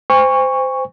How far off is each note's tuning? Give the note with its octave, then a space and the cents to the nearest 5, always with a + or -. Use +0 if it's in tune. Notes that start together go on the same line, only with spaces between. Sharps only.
C5 -20 G#5 -45 C#6 +0